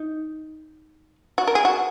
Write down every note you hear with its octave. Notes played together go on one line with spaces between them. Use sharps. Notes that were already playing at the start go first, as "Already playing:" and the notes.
Already playing: D#4
F#4
A#4
G#4
F#4